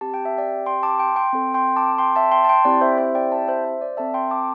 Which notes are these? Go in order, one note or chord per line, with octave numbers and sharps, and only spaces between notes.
C4 G4 A5
G5
E5
D5 G5
G5 C6
A5 D6
G5 C6
G5 C6
C4 A4
G5 C6
A5 D6
G5 C6
E5 A5
G5 C6
A5
G5 C6
C4 E4 G4 D5 G5
C5 E5
C5 E5
D5 G5
E5 A5
C5 E5
C5
D5
C4 A4 E5 A5
G5 C6
A5 D6